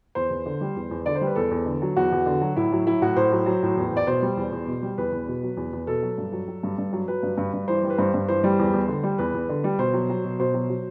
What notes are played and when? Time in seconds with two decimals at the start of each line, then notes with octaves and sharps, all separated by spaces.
0.15 E2 C5
0.30 E2
0.46 D3
0.61 G3
0.76 E2
0.91 E2
1.06 D3 D5
1.15 C5
1.21 G3
1.27 B4
1.36 E2 A4
1.51 E2
1.66 D3
1.82 F#3
1.96 E2 F#4
2.12 E2
2.26 D3
2.41 F#3
2.56 A2 E4
2.72 F#3
2.87 F#3 E4
3.02 A2 F#4
3.16 A2 C5
3.32 F#3
3.46 F#3
3.62 A2
3.77 E2
3.92 E2 D5
4.07 B2 C5
4.22 G3
4.37 E2
4.52 E2
4.67 B2
4.82 G3
4.98 E2 B4
5.12 E2
5.28 B2
5.43 F#3
5.57 E2
5.73 E2
5.87 B2 A4
6.02 F#3
6.18 G2
6.32 F#3
6.48 F#3
6.63 G2
6.78 G2
6.93 F#3
7.08 F#3 B4
7.23 G2
7.38 G2
7.53 G2
7.68 E3 C5
7.83 G3
7.90 B4
7.98 G2 C5
8.14 G2
8.28 E3 C5
8.44 G3
8.59 E2
8.73 E2
8.89 D3
9.03 G3
9.19 E2 B4
9.34 E2
9.49 D3
9.64 G3
9.78 B2 C5
9.93 F#3
10.10 F#3
10.24 B2
10.39 B2 C5
10.54 F#3
10.69 F#3